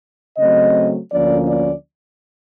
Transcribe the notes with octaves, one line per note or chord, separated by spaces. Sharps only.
C#3 F#3 A3 C4 D#5
D2 D3 F3 A#3 C#4 D5
D5